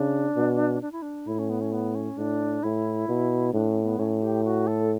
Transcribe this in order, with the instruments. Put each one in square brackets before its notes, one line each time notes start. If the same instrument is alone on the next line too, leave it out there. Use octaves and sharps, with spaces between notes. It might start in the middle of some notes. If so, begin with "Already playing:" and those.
Already playing: [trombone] C#3 [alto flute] D4
[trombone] B2
[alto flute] D4
E4
D4
[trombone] A2 [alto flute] E4
[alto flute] C#4
B3
C#4
B3
C#4
[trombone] A2 [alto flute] D4
[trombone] A2 [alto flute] E4
[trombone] B2
[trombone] A2 [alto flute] D4
[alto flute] C#4
B3
[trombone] A2 [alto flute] C#4
[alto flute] G4
F#4
A4